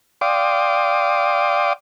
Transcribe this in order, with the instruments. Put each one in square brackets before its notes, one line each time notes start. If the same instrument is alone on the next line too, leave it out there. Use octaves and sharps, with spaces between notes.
[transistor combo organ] D5 F5 G5 C6 D6 D#6